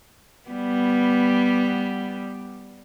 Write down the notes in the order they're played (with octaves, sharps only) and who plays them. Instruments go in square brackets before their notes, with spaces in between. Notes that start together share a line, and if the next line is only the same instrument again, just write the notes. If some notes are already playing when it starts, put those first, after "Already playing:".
[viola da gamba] G3 B3